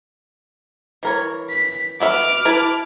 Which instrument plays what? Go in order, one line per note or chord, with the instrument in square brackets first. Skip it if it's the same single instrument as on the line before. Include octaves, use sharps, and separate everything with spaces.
[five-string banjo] E3 A#4 C#5
[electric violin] B6
[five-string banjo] B3 F#4 E5 [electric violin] D6 F6
[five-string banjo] E4 B4 A5